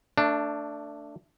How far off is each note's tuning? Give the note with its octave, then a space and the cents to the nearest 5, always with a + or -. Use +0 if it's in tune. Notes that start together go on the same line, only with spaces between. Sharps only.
A3 +25 D4 +0